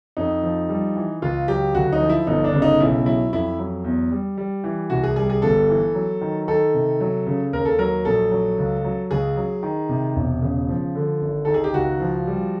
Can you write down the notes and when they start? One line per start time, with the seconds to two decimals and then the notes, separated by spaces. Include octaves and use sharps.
0.17 F2 D#4
0.43 F3
0.69 G3
0.96 E3
1.22 C#2 F4
1.48 F#3 G4
1.74 D2 F#4
1.92 D#4
2.01 F3
2.10 E4
2.27 G1 D#4
2.44 D4
2.53 C#3
2.62 D#4
2.80 B1 E4
3.06 F#3 E4
3.33 F2 E4
3.59 F#3
3.84 E2
4.11 G3
4.38 G3
4.64 E3
4.90 C2 F#4
5.03 G#4
5.16 G3 G#4
5.30 G#4
5.42 G1 A4
5.69 E3
5.95 F#3
6.21 D#3
6.48 D#3 A4
6.74 C3
7.00 F#3
7.27 C#3
7.53 D#2 A#4
7.65 A4
7.79 F#3 A#4
8.05 A#1 A4
8.31 F#3
8.58 C#2
8.84 F#3
9.11 C#2 G#4
9.37 F#3
9.63 D#3
9.89 C3
10.16 E1
10.42 C#3
10.69 F3
10.95 D3
11.21 G#1
11.45 D#3 A4
11.54 G#4
11.64 G4
11.73 C#2 F#4
12.00 F3
12.27 G3